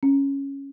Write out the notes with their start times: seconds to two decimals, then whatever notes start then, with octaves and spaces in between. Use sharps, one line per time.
0.03 C#4